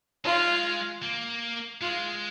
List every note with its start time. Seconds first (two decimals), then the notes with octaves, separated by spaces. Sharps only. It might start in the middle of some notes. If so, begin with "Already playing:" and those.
0.25 G#3 F4
1.03 A#3
1.81 G#3 F4